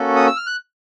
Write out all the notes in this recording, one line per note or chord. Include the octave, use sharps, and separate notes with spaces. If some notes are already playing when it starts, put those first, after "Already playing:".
Already playing: A#3 C#4 F#4 A4
D#6
E6
F6
F#6